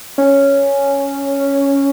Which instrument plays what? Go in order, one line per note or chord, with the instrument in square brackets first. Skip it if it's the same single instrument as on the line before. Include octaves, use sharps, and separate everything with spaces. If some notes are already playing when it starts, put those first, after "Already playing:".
[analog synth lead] C#4